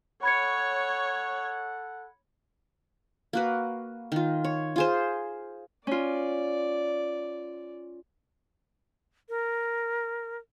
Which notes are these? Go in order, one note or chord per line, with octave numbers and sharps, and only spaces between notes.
A4 C#5 F#5 B5 G#6 C#7
A#3 F#4 B4
D#3 F4
C#5
F4 G#4 C5
C#4 F4 D5
A#4